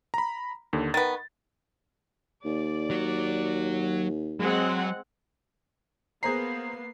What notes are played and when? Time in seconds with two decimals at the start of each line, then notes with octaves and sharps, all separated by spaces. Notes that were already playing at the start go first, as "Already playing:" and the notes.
0.14 A#5 B5
0.73 D#2 D3
0.94 D#3 B3 A6
2.45 D#2 D5
2.90 F#3 F#4
4.40 F#3 G#3 C4 F#5
6.23 A#3 B3 G#4 C5 A#5 C7